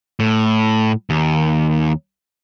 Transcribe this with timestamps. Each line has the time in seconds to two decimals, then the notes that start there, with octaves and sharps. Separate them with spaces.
0.20 A2
1.10 D#2